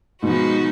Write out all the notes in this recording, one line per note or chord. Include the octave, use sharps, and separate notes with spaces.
G#2 B2 F3 G#3 D#4 F#4 B4